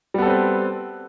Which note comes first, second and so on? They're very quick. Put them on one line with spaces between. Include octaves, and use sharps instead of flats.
G3 B3 A4 C4 B4